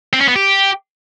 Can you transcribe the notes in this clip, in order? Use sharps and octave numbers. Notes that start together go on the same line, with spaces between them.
C4
C#4
B3
G4